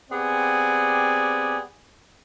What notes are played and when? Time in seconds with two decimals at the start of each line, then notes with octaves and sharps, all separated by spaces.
0.11 B3 C4 G4 G#4 D5 G#5